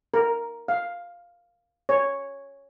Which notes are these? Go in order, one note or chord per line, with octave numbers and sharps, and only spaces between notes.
A#4
F5
C#5